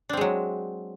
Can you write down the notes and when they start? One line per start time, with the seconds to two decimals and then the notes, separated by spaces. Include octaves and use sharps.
0.09 D4
0.13 C4
0.17 G#3
0.21 F#3